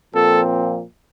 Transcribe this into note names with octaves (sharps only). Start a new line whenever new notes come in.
A#2 F3 C4 A4